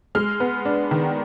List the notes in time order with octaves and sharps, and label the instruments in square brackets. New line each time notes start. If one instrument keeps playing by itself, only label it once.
[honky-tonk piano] G#3 F6
B3
D4
D#3